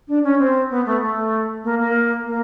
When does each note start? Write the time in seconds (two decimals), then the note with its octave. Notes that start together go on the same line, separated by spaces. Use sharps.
0.08 D4
0.24 C#4
0.39 C4
0.70 B3
0.86 A3
1.02 A3
1.64 A#3
1.79 A#3
2.26 A#3